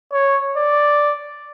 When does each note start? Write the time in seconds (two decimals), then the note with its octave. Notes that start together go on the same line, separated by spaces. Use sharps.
0.13 C#5
0.57 D5